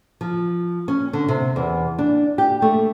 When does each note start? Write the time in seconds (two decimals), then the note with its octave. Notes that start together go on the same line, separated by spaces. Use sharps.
0.21 F3
0.88 C#4
1.13 D3
1.29 C3
1.56 E2
1.99 D4
2.38 G4
2.62 A3